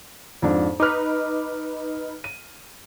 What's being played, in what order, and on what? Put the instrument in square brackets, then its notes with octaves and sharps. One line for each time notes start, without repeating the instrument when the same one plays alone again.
[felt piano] F2 G#2 D4
[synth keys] D#4 B4 [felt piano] D6 F6
[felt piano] D#7